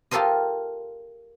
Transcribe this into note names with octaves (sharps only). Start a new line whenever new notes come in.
F4 G4 A4 A#4 C5 D#5